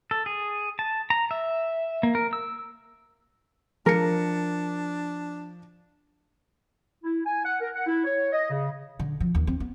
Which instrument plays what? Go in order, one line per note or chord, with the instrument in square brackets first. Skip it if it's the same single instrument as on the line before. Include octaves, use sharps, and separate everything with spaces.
[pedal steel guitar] A4
G#4
A5
A#5
E5
A#3
A#4
E6
[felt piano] F3 C#7 [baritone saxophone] D4 [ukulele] A#4
[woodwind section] E4
G#5
F#5
A#4
F#5
E4
C#5
D#5
C#3
[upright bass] D3
F3
D#2
C4
B3